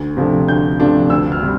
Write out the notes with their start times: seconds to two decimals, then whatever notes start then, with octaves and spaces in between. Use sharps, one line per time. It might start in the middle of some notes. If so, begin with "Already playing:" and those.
Already playing: D2
0.17 C3 F3 A3 D4
0.48 D2 G6
0.80 C3 F3 A3 D4
1.10 D2 E6
1.32 F6
1.42 C3 G3